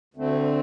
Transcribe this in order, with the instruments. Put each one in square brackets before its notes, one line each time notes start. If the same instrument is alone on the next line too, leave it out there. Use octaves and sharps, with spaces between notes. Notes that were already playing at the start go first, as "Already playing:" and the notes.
[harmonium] D2 D3 A3 C4